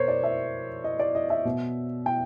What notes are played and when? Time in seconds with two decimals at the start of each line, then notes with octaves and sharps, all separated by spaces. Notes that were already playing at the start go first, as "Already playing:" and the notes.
Already playing: B2 A#4 C5 C#5
0.08 D5
0.24 E5
0.84 D#5
1.00 D5
1.15 D#5
1.30 E5
1.45 B2
2.06 G5